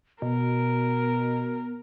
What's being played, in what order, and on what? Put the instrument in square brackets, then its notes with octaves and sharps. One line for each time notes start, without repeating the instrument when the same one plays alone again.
[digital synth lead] B2 [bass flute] B3 [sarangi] A#4